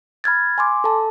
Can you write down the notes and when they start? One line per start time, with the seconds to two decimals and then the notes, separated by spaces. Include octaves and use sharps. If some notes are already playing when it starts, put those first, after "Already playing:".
0.24 B5 F6 G#6 A6
0.58 G#5 C6 D6
0.84 A4 A5